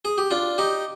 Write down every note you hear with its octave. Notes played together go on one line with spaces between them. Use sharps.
G#4
G4
D4 F4
D#4 G4